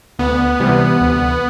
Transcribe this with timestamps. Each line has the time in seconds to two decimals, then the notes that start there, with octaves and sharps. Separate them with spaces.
0.19 D2 B3
0.60 C3 E3 G3
1.01 D2